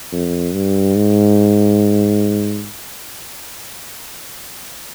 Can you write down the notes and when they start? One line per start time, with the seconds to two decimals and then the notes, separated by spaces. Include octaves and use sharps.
0.12 F2
0.54 G2
0.96 G#2